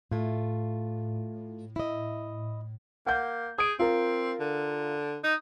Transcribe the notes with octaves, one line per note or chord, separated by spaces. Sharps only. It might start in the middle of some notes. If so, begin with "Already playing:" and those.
A2 A3 F4
E4 D#5
A#3 F#5 G6
G#4 D#6 D7
C4 F4 A#4
D3
D#4